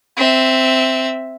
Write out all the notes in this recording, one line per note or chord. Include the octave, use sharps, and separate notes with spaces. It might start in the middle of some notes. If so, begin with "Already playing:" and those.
C4 E5